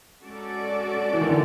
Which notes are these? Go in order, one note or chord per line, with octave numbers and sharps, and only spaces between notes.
G#3 C#4 F#4 A4 D5
E3
D#3
D3